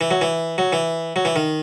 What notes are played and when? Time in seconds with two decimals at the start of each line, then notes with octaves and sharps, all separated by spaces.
0.01 E3
0.11 F#3
0.21 E3
0.58 F#3
0.73 E3
1.16 F#3
1.25 E3
1.36 D#3